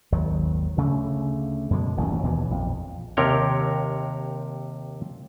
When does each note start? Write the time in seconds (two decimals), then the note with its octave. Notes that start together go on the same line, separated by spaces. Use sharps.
0.12 G#1 D#2 D#3 F#3
0.77 D2 C#3 A3
1.70 F#2 B2 D3 G#3
1.96 D#1 A1 D2
2.23 D#2 B2 E3
2.51 A#1 F2
3.17 D#2 C3 A#4 C#5 G5